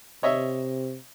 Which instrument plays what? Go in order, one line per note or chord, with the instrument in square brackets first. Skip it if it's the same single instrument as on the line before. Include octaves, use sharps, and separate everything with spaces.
[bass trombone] C3 [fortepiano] C#5 D#5 E5